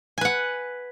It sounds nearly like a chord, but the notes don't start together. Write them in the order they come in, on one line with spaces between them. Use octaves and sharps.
G#5 B4 F#5